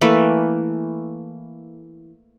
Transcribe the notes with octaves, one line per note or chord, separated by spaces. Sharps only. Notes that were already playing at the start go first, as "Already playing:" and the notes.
E3 A3 A#3 B4